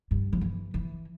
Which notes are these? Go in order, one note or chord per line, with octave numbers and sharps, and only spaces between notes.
G2
F3
E3
E3